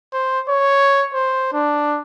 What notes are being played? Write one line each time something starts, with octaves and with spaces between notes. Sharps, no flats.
C5
C#5
C5
D4